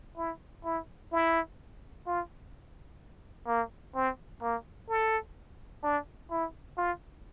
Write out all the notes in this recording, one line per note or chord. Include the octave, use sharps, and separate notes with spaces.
E4
E4
E4
F4
A#3
C4
A#3
A4
D4
E4
F4